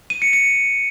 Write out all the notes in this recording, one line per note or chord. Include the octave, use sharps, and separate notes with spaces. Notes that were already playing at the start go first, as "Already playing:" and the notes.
D#7
C#7
C#7